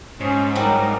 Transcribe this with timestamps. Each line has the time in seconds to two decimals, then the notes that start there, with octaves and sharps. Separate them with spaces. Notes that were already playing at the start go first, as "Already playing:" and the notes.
0.21 G#2 C#4 C5
0.55 F#3 G3 D4 D#4 A#4 G5